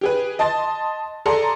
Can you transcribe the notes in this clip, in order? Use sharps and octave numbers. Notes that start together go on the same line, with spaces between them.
G4 G#4 B4
D#5 A5 C6 A6
G#4 A4 D5 A#5 C6